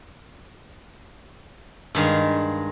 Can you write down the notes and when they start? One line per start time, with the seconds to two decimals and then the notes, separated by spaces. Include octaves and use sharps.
1.95 G2 D#3 G#3 F5